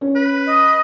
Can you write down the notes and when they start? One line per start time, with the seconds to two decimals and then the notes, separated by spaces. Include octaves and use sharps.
0.01 C#4
0.16 B4
0.47 D#5